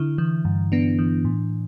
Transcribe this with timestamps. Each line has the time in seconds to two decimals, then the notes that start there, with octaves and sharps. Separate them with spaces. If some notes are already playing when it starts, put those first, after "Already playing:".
Already playing: D3 E4
0.18 E3
0.45 G2
0.72 B3 D4
0.99 E3
1.25 A2